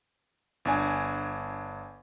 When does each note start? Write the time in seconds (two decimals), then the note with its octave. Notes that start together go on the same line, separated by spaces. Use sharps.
0.65 G1 D4 G#5